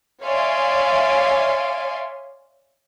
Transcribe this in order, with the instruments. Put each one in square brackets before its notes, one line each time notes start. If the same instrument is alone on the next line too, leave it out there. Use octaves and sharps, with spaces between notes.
[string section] C#5 D5 E5 F5 G#5 C6